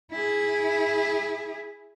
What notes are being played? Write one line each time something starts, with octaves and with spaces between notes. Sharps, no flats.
E4 G#4